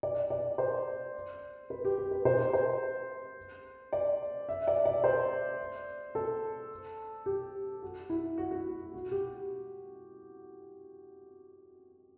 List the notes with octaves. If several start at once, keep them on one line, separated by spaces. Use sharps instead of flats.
D5
D5
C5
B4
G4
G4
B4
C5
C5
D5
E5
D5
D5
C5
A4
G4
F#4
E4
F#4
F#4
F#4
F#4
G4